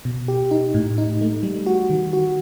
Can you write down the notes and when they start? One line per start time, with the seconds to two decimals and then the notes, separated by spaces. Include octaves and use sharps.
0.05 B2
0.28 G4
0.51 D#4
0.74 A2
0.98 D#4
1.21 A3
1.43 G3
1.66 F#4
1.90 D#3
2.13 F#4